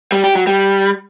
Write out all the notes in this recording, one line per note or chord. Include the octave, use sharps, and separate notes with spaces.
G3
G4
F#3
G3